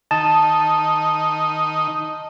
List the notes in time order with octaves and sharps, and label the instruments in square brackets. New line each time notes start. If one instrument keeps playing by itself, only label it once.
[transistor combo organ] D#3 D#4 [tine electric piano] A5